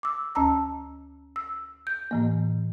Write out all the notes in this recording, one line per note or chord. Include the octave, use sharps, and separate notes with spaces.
D6 E6
D2 C#4 A5 A#5 E6
E6
G6
A2 E3 A#3